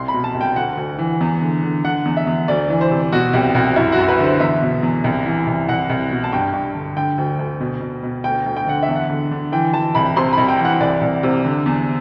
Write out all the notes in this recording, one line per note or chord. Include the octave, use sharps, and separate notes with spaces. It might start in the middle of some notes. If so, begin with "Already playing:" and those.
Already playing: C2 C6
B5
B2
A5
C2
G5
D2 F#5
D2
E3
E2
D3
D3
D3 F#5
E2
E5
E2
D2 D5
E3
C5
C3
B2 F#4
C2 G4
C2 F#4
F#2 E4
F#4
F#2
B4
D3 C5
E2 E5
B2
E2
C2
E3
C2
C2 F#5
C2
B2
A5
G2 G5
G2
D3
D3 G5
D2
D2
B2
B2
B2
D2 G5
D2
G5
D3 F#5
E5
E2
F#5
D3
D3
E3 G5
E3 A5
C2 B5
C3 C6
C2 B5
G5
E3
F#5
C2 D5
C2
C3
D3
E2